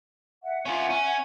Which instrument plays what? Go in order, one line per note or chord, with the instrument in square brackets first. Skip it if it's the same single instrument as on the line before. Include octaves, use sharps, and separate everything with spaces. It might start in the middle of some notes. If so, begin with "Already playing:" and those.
[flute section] E5 F#5
[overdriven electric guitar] C#4 F4
C#4